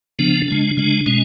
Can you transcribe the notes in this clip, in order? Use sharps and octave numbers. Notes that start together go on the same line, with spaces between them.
C#3 F3 B3 D4
C#3 G#3 D4
C#3 G#3 D4
B2 G#3 C#4